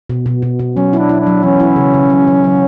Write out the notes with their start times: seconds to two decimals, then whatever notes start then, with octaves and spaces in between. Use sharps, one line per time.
0.10 B2
0.26 B2
0.42 B2
0.59 B2
0.76 F#3 C#4
0.93 E4
0.99 D4
1.09 E4
1.20 D4
1.27 F#3
1.43 E3 C#4
1.60 E4
1.76 C#3
1.94 C#3
2.10 F#3
2.27 F#3
2.44 F#3